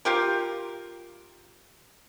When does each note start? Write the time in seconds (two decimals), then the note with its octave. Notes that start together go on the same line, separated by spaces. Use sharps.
0.05 F4 G4 A#4